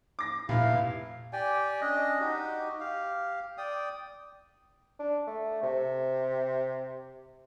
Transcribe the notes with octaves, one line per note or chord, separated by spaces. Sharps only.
D6 A#6
F1 A#2 E4 F5
G4 D5 G5 G#5
C#4 D4 D#5
D#4 F#4 G4
G4 F5
D5 G5 D#6
D4
A3
C3